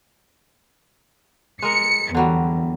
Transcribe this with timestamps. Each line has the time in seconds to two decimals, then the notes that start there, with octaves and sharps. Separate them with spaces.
1.62 G#3 A#4 C#7
2.15 E2 D3 F#3 G3